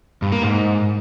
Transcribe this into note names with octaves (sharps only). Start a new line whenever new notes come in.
G2
A#3
G#2